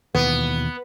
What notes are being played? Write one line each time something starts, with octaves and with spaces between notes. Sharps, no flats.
D#2 B2 E3 B3